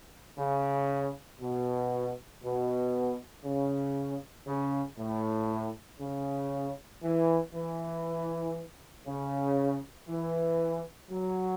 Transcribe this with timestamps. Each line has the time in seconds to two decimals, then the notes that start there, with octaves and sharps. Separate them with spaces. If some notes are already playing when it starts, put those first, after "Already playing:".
0.38 C#3
1.41 B2
2.43 B2
3.44 C#3
4.47 C#3
4.98 A2
6.00 C#3
7.03 E3
7.54 E3
9.06 C#3
10.09 E3
11.11 F#3